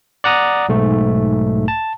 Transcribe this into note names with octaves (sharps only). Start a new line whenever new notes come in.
D5 F#5 A#5 D#6
B1 G#2 A3
A5